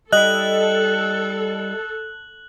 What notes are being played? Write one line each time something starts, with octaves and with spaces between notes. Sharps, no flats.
G3 E4 A4 D#5 F#6 F#7